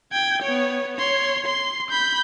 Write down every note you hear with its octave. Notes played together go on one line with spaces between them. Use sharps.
G5 G#6
B3 C#5
C#5 C6
C6
B5 G6